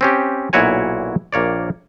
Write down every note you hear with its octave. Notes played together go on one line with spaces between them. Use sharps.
C4 C#4 G4
B1 A#2 E4 F#4 C#5 G#5
A#1 A#3 C#5 D5